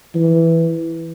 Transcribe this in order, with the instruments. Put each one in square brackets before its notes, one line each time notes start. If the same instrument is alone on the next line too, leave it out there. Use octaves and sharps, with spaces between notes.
[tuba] E3